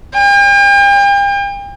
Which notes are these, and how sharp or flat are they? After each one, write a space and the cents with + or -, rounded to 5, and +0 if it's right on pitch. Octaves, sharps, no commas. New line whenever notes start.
G5 +40